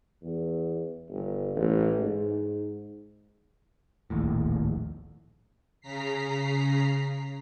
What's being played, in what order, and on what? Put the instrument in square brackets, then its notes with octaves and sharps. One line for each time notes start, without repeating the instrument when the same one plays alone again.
[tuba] E2
G1
A1
G#2
[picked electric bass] D1 A#1 D#2 A2
[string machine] C#3 A#5 B6 C7